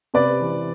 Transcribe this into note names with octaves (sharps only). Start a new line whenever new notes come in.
C3 B4 D5
E3